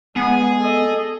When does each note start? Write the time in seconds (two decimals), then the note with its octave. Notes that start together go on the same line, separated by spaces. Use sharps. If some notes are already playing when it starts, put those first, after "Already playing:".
0.16 G#3 B3 G#4
0.61 A4 D#5